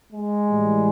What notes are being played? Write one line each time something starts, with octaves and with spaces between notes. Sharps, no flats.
G#3
A2 E3 G3